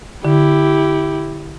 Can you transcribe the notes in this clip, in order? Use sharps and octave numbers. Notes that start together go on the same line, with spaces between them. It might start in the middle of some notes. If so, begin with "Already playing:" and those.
D3 E4 G4